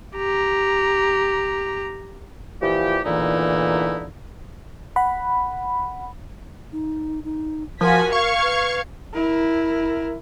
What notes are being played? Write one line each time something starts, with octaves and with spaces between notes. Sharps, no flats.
G4 A#5
A#2 E3 F3 G4
E2 A#2 D3 E3 D#4 E4
F#5 B5
D#4
D#4
F3 F#4 A#4 G#5 B6
F5 C#6 G#6 C#7
B4
E4 A#4